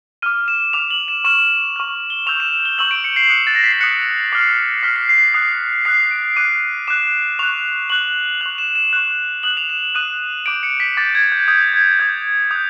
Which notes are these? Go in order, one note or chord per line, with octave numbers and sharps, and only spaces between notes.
D6 F6 D#7
E7
D6 F6 F7
F#7
E7
C#6 F6 E7
C#6 F6
G7
C#6 E6 G6 F7
E7
G7
C#6 E6 G6 F#7
D7
C#7
C7
D#6 F#6 C#7
A6
A#6
B6
C7
D#6 F#6 C#7
D6 F6 C7
D6 F6 B6
C7
C7
D#6 F#6 C7
D#6 F#6 C7
D7
D6 F#6 D#7
D6 F#6 E7
C#6 F#6 F7
C#6 F#6 F#7
C#6 F#6 F7
E7
E7
C#6 F#6
D#6 F#6 F#7
F7
E7
D#6 F#6 D#7
D6 G6 D7
C#7
B6
D6 G6 A6
G#6
G6
D#6 G6
G#6
D#6 G6 G#6
D#6 F#6 G6